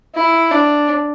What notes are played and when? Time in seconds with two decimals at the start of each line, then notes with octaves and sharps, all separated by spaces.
0.15 E4
0.51 D4